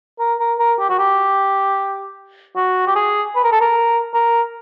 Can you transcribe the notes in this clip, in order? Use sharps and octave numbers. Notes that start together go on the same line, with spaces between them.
A#4
A#4
A#4
G4
F#4
G4
F#4
G4
G#4
B4
A#4
A4
A#4
A#4